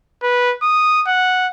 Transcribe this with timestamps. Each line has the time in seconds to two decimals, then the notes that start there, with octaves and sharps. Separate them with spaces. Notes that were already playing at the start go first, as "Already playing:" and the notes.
0.23 B4
0.62 D#6
1.07 F#5